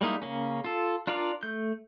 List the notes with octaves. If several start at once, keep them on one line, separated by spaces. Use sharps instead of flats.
G3 G#3 A#3 D#4 E4
C#3 A#3 C#4
F4 A4
D4 F4 A#4 D5 F5
A3 G6